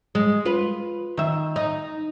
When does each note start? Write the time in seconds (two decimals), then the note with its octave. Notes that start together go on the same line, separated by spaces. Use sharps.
0.15 G#3
0.45 F4 B4
1.17 D#3 E5
1.56 D#4